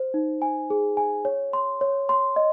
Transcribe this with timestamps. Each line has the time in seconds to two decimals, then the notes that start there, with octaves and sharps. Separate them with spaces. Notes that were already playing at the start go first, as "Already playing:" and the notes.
Already playing: C5
0.14 D#4
0.42 G#5
0.70 G#4
0.97 G#5
1.25 C#5
1.53 C6
1.81 C#5
2.09 C6
2.36 D#5